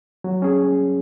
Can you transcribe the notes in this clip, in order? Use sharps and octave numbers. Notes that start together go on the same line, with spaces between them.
F#3
C#4 G#4